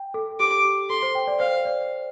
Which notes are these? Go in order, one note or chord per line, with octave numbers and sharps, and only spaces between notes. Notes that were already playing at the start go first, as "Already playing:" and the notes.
Already playing: G5
A4
G4 D6
G4
A4 C6
C5
G5
D5
C5 F5
D5